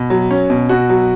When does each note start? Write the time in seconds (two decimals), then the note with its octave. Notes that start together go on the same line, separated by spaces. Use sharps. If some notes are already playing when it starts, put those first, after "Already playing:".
Already playing: B2
0.10 F#3
0.31 C#4
0.50 B2
0.69 B2 F#4
0.89 F#3